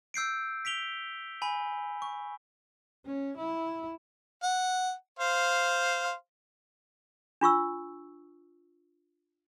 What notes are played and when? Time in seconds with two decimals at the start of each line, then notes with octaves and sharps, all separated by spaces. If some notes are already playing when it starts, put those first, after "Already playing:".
0.14 E6 G6 C7 D7
0.65 B6 D7 F7 G7
1.42 G#5 B5
2.02 C#6
3.06 C#4
3.37 E4
4.43 F#5
5.20 C5 F5
7.41 D4 F4 C#6 E6